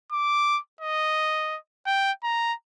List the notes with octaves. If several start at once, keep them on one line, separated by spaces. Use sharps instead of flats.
D6
D#5
G5
A#5